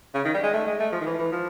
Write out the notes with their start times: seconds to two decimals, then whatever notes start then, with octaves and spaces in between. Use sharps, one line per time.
0.15 C#3
0.25 D#3
0.34 G3
0.44 G#3
0.54 A3
0.67 G#3
0.80 A3
0.92 F3
1.01 D#3
1.06 E3
1.19 E3
1.32 F3